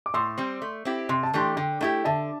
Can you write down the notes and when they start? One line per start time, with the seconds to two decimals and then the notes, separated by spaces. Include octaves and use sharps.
0.06 D6
0.14 A2 C6 E6
0.38 G3 C4
0.62 A3
0.85 C4 E4 G4
1.09 C3 C6
1.23 A5
1.33 E3 A3 D4 G4 G5 C6
1.57 D3 G5
1.81 A3 E4 G4 G5
2.05 D3 E5 A5